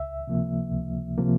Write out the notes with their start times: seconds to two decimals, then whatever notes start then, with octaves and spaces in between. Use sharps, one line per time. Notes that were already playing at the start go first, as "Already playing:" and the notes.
Already playing: C#2 E5
0.27 C3 F3 A#3
0.72 C#2
1.18 C3 F3 A#3